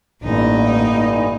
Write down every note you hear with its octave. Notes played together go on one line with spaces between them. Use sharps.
A1 G2 D3 E3 A#3 D#4